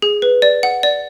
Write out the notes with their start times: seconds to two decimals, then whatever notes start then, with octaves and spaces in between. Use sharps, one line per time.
0.02 G#4
0.22 B4
0.42 D5
0.63 F#5
0.83 D5